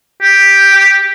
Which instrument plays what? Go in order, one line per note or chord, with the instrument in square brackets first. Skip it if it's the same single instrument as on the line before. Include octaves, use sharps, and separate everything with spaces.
[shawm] G4